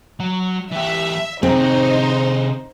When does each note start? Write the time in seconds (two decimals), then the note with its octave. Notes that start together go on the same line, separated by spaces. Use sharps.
0.20 F#3
0.72 E3 G4 E5
1.43 C3 C4 D#4 G#4 C5